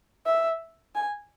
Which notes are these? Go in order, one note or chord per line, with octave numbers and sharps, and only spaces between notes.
E5
G#5